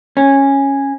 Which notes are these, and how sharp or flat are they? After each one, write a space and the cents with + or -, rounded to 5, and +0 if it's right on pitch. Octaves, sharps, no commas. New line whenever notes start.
C#4 -10